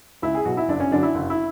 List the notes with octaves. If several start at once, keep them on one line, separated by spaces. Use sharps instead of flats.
C#2 E4
G#4
B2 F#3 F#4
E4
F#1 D4
C#4
F#2 D3 F#3 D4
E4
F#1
E4